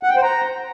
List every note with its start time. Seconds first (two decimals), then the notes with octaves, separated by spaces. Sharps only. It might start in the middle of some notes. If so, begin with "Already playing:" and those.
0.03 F#5
0.10 G5
0.16 C5
0.23 A#5